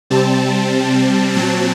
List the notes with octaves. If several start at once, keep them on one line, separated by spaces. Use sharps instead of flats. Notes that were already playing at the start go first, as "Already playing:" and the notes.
C3 G3 C4 A5
A#2 F#3 C4 A5